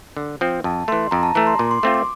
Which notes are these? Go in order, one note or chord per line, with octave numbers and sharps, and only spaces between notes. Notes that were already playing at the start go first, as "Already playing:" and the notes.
D3
F3 C4
F2 A5
E3 A3 C6
F2 A#5
A5
E3 A3 A#5
C6
A#2 D6
C6
A3 C4 F4 D6
D6